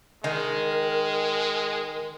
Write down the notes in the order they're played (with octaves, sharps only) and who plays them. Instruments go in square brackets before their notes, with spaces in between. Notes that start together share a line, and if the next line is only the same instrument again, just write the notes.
[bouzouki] D#3 [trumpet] G#3 [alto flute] A#4